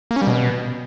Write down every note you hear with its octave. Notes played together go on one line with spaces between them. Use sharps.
A#3
C#4
G3
B2